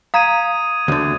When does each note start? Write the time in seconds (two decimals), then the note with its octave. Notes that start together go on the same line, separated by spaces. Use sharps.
0.14 F5 A#5 D#6 G#6 D#7
0.88 D2 D3